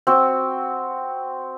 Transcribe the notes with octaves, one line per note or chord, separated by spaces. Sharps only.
C4 F#4